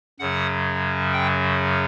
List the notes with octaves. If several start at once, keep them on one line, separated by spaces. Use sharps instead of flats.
F#2 C#3 F#3 F#5
G5